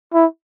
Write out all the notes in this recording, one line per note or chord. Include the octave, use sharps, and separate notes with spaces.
E4